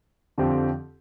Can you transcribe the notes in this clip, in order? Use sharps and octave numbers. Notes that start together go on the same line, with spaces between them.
F2 D3 F3 C4 G4